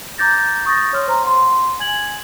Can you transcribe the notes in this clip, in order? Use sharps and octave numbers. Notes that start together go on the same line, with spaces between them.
A#5 D6 G6 A6 A#6
C#6 D#6 G6 A6 A#6
C#5 C6 F6
C5 A#5 C6
F#5 C6
G#5 G#6 F#7